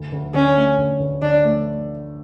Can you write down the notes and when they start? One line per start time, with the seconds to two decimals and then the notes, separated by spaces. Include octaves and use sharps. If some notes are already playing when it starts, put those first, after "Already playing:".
Already playing: D2
0.12 D2
0.34 D3 C#4
0.56 A3
0.78 D2
1.00 D2
1.22 D3 D4
1.44 A3